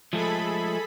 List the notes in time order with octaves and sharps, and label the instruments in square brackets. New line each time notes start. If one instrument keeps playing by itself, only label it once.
[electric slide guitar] F3 G#3 A3 [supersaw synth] G#4 A4 B5